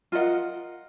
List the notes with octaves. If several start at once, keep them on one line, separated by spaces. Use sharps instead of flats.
F4 A#4 D#5 F#5